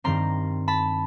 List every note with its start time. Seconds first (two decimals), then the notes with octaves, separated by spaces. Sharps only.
0.04 G2 D#3 G3 C4 A#5 C6
0.68 A5 B5